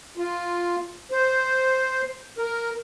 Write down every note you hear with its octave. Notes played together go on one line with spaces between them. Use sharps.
F4
C5
A#4